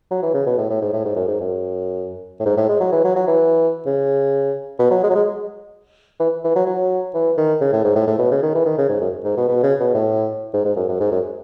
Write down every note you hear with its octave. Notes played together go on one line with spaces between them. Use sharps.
F#3
E3
C#3
B2
A2
A2
G#2
A2
G#2
F#2
G#2
F#2
A2
G#2
A2
G#3
F#3
E3
F#3
F#3
E3
C#3
B2
F#3
G#3
F#3
G#3
E3
E3
F#3
F#3
E3
D#3
C#3
A2
G#2
A2
A2
B2
C#3
D#3
E3
D#3
C#3
G#2
F#2
G#2
B2
B2
C#3
B2
A2
G#2
G#2
F#2
F#2
G#2
F#2